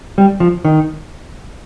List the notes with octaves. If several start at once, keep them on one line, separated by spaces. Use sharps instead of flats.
G3
F3
D#3